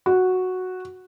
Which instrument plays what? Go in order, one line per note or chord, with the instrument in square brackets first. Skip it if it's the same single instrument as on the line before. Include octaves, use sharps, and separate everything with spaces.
[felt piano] F#4